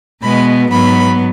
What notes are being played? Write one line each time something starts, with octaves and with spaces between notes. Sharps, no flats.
B2 G#3 B3 B5
G#2 F#3 B3 B5